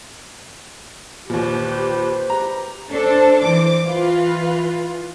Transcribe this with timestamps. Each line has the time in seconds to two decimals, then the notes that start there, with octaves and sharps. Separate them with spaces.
1.30 D#2 A#2 G4 B4 C5
2.30 G4 A#5
2.91 D4 A4 C5
3.43 E3 C5 D6
3.84 E3 F4 B4